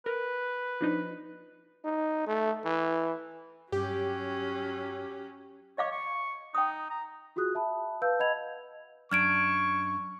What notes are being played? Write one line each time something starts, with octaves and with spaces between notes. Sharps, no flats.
A#4 B4
F3 D4 D#4
D#4
A3
E3
G2 F#3 C#4 G4
C#5 D#5 F5 D6
C#6
D#4 G5 D#6
A#5
F4 F#4 G#4 D#6 F#6
E5 A5 B5
B4 F5 A5 E6 G6
D#5 F#5 B5 G#6 F7
F#2 D4 C#6 F6 G#6 D7